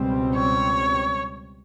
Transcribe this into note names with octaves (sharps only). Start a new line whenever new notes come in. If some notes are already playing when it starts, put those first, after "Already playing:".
Already playing: C#2 B2 G3 C4
C#5